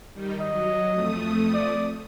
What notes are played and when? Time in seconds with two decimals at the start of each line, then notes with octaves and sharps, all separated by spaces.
0.12 D#3 G3 D#4
0.41 F#3 D#5
0.91 F2 A3 D#6
1.54 D5